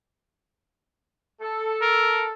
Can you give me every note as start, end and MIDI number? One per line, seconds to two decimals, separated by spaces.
1.41 2.31 69
1.82 2.27 70